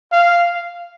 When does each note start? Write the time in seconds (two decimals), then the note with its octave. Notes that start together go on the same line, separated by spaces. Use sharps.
0.12 F5